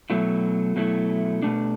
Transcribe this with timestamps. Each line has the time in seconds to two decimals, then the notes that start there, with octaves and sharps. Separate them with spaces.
0.10 B2 F#3 A3 E4
0.76 B2 F#3 A3 E4
1.42 B2 A3 D4